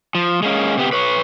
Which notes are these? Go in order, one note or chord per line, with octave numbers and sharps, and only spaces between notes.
F3
G#3 A#3 C#4
C3 B3 G4
B4 C#5